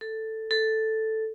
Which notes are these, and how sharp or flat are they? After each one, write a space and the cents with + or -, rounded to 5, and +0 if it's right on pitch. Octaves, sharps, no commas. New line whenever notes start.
A4 +5
A4 +0